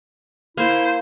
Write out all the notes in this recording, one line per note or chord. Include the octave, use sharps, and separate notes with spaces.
A#3 E4 C5